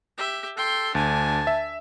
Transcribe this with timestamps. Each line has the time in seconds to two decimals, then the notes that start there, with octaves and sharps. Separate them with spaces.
0.17 G4 E5
0.57 A4 G5 C6
0.95 D2 D4 G#5 A5
1.47 E5